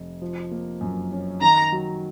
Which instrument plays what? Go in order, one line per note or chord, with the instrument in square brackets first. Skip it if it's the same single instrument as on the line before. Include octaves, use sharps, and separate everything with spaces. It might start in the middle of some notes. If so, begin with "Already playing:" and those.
Already playing: [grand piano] F1
F3
A#3
F#2
C#4
[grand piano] D#3 [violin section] A#5
[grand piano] F#3